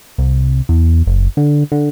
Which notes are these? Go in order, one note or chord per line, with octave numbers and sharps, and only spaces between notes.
C2
E2
F#1
D3
D3